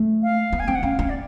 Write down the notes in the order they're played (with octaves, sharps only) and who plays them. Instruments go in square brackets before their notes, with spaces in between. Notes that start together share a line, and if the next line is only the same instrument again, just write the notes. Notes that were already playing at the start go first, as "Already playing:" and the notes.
Already playing: [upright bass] A3
[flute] F5
[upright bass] B3
[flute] G#5
[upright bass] C4 [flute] G5
[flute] F#5
[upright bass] C#4 [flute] F5
[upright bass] C#4
[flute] D5